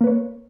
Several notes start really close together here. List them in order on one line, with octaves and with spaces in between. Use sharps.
A#3 B4 C#5